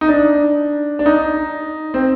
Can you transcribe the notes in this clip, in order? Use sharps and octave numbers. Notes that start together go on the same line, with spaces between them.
D#4
D4
D4
D#4
C4